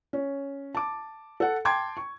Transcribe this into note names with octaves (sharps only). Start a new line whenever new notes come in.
C#4
A5 D6
A4 F#5
G5 A5 C6 D6 G#6
C#6